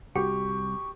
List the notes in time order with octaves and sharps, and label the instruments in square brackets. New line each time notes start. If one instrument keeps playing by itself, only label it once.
[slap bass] C2 [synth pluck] F#4 [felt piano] G4 [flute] C#6